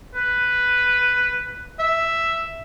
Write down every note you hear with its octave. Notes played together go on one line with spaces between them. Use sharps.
B4
E5